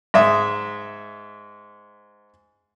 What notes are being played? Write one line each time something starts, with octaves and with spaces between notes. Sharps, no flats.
G#2 E5 D#6